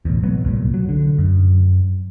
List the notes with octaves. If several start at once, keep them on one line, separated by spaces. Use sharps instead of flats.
E1 A1 E2
F#3 B3
C2 G2 A#2
F#3
D3
F#2